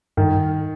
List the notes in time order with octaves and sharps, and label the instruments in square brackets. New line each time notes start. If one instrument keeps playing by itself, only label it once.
[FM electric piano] G2 [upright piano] D#3